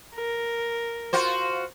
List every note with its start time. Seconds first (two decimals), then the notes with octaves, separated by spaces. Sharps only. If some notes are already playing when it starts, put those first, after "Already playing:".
0.16 A#4
1.13 F4 F#4 C5